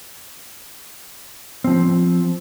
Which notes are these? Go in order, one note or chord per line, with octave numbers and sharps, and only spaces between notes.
F3 C4